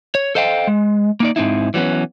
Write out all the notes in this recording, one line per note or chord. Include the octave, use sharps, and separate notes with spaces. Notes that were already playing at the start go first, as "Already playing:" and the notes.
C#5
A4 C5 D#5 F5 G5
G#3
A#3 D#4 D5
G#2 C4 D#4 E4
E3 F#3 G3 B3 C#4